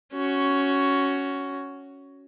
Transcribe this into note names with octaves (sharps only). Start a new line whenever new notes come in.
C#4 F#4